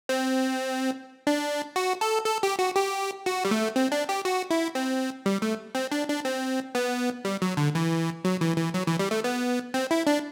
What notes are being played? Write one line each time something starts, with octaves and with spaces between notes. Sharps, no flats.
C4
D4
F#4
A4
A4
G4
F#4
G4
F#4
G3
A3
C4
D4
G4
F#4
E4
C4
G3
A3
C4
D4
D4
C4
B3
G3
F#3
D3
E3
F#3
E3
E3
F#3
E3
G3
A3
B3
C4
E4
D4